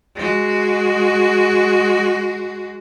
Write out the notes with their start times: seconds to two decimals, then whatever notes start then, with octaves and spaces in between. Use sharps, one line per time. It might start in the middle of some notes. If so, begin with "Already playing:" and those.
0.15 G#3 F#4